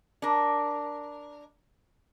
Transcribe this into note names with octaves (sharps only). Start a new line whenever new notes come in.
D4 A#4